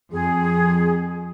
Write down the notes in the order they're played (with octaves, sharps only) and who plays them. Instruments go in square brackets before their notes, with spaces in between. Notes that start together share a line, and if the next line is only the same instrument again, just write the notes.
[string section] F2 [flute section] G#4